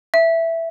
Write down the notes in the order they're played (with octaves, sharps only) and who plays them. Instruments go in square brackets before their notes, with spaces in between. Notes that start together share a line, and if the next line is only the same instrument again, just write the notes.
[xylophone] E5